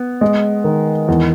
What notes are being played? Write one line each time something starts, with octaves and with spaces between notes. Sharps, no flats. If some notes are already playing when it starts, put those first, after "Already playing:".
Already playing: B3
G#3
D#3
E2